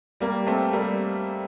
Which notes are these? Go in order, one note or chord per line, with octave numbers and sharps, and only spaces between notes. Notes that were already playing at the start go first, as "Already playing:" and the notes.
G3 A#3
A3 C4
G3 A#3